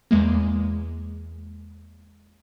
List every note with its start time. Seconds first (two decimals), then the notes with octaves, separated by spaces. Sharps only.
0.11 E2 G#3 A#3